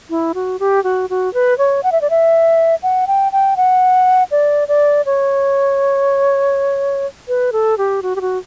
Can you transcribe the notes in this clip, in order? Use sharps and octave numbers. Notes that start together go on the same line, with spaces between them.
E4
F#4
G4
F#4
F#4
B4
C#5
F#5
E5
D5
E5
F#5
G5
G5
F#5
D5
D5
C#5
B4
A4
G4
F#4
G4
F#4